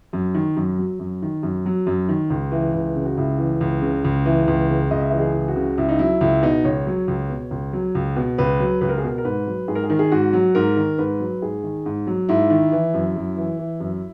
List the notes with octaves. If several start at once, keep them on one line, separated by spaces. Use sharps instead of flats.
F#2
D#3
F#2
F#3
F#2
D#3
F#2
F#3
F#2
D#3
C#2
E3
C#2
C#3
F#4
C#2 E4
E3
C#2
C#3
C#2
E3
C#2
C#3
C#2 D#5
E5
E3 D#5
G#4
C#2
F#4
C#3
C#2 E4
D#4
F#3 E4
C#2 E4
B2 D#4
C#2 C#5
F#3
C#2
B2
C#2
F#3
C#2
B2
C#2 B4
F#3
C#2 B4
A#4
G#4
B2 A#4
A#4
G#2 B4
F#3
G#2 G#4
A#4
G#4
D#3 A#4
G#4
G#2 F#4
F#3
G#2 A#4
D#3
G#2 B4
F#3
G#2 G#4
D#3
G#2
F#3
G#2 E4
D#3
E3
F#2
F#2
E3
E3
F#2